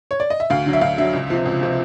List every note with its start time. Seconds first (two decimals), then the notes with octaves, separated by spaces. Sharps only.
0.11 C#5
0.20 D5
0.30 D#5
0.40 E5
0.50 D2 F5
0.66 D3 F#3
0.73 E5
0.81 D2 F5
0.98 D3 F#3 E5
1.13 C#2
1.30 C3 F3
1.46 C#2
1.61 C3 F3